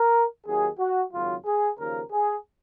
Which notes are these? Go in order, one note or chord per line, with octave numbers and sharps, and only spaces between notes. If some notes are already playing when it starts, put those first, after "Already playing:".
Already playing: A#4
D#2 D#3 F#3 G#4
F#4
G#1 F#2 C#3 F#3 F4
G#4
D#2 C#3 F3 A#4
G#4